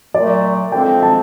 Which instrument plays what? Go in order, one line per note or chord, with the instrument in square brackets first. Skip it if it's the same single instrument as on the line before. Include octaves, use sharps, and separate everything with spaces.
[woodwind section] A#2 F#3 A3 [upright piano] D5
[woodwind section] D3 F3 G#3 C4 [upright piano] G5
[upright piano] A5